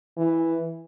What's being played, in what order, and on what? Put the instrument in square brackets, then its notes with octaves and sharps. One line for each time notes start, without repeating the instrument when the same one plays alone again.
[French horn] E3